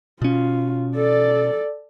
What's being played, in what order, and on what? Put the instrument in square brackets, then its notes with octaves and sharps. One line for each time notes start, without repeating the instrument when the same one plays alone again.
[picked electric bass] B2 C#4 [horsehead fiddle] F4
[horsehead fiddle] A4 D5